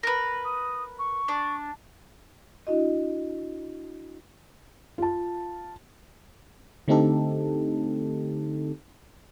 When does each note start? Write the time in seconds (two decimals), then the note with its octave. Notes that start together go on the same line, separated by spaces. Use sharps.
0.03 A#4 B4
0.45 D#6
0.99 C#6
1.28 D4
2.67 D4 E4 F#4 D#5
4.98 F4 A5
6.88 D3 A3 C4 D#4 G4 A4